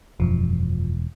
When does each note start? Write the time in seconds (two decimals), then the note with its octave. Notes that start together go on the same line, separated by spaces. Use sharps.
0.20 E1 F#2 F3